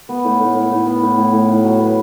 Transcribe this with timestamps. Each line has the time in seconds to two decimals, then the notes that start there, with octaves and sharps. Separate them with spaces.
0.09 B3
0.25 A2
0.40 A2
0.56 A2
0.71 A2
0.87 B3
1.02 A2
1.18 A2
1.33 A2
1.49 A2
1.64 F#3
1.80 B3